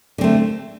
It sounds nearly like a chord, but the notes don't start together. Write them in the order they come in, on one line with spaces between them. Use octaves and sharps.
D3 C4 A3